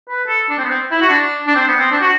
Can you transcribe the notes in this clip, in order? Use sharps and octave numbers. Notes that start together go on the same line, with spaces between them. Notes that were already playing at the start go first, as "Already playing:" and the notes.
B4
A4
D4
C4
B3
C4
E4
F#4
D4
D4
C4
B3
C4
D4
F#4